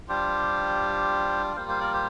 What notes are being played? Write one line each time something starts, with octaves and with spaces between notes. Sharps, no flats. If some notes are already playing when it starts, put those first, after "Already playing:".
G3 D4 F4 G4 C5
G3 A#3 F4 C5 F5
C5 F5
A#4 D5
G4 C5